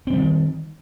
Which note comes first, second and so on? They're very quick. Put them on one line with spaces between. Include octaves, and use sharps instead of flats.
C4 E3 G3 D#3